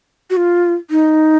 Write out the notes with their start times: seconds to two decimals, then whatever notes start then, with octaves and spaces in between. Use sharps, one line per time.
0.30 F#4
0.37 F4
0.90 D#4